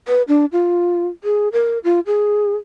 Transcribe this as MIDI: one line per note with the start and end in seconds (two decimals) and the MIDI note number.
0.08 0.22 71
0.28 0.45 62
0.52 1.07 65
1.24 1.48 68
1.53 1.78 70
1.84 2.00 65
2.06 2.56 68